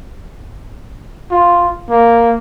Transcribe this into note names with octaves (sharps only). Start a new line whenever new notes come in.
F4
A#3